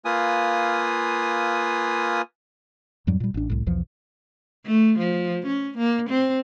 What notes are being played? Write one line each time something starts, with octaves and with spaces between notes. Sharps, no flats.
A#3 F4 B4 G#5 D#6
F2 G#2 F#3 G3
A#2 G3
A1 D4
C2 A2
B1 E2 E3 F3
A3
F3
C#4
A#3
C4